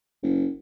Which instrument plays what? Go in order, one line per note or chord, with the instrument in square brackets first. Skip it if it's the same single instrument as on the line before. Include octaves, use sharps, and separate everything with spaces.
[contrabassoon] F#1